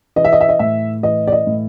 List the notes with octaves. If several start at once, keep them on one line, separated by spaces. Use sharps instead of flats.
E3 D#5
E5
D#5
E5
D#5
A2 E5
E3 D#5
D5
D#5
A2